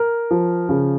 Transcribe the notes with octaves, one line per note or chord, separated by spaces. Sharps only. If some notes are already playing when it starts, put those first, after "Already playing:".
Already playing: A#4
F3
C#3